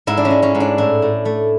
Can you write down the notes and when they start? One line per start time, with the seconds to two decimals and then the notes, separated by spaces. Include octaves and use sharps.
0.07 G#2 E4
0.17 D4
0.25 C#4
0.31 G#3
0.42 C#4
0.55 G#2
0.60 D4
0.78 A2 E4
1.02 A2
1.25 A3